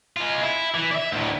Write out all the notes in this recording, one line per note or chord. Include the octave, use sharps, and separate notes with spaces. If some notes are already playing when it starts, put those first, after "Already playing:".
G#3 F4
E4
E3
D5 E5
D2 A2